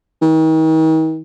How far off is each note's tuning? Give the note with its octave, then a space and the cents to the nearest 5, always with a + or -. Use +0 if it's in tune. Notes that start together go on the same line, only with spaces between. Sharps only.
D#3 +40